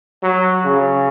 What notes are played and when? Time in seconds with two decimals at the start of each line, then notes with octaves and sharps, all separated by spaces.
0.23 F#3
0.65 C#3